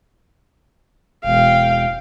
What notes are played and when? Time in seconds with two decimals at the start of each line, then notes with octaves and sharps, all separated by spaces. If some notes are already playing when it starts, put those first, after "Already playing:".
1.25 E1 F5 G5